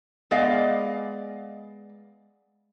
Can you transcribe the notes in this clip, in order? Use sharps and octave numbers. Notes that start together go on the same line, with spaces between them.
G#3 B3 D5 D#5 F5